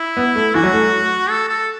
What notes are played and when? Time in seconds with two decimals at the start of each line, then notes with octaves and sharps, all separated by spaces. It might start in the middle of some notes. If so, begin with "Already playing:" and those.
Already playing: E4
0.17 B3
0.35 A3
0.54 E3 F#4
0.63 F#3
0.73 A3
1.29 A4
1.49 A4